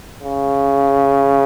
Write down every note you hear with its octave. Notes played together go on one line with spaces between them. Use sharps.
C#3